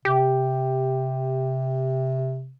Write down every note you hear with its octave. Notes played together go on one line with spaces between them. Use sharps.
C3 G4